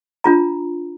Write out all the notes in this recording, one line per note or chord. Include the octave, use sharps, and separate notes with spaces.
D4 F4 A#5